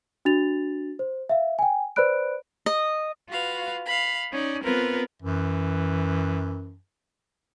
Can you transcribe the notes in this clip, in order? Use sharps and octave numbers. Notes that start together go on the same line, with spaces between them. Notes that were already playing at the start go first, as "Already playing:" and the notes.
D4 F#4 A6 F7
C5
E5 F5
G5 G#5
B4 C5 D5 B5 F#6 D7
D#5
F4 F#4 B4 F5
F5 B5
C#4 D#4 D5
B3 C4 F4 A#4 B4
F#2 E3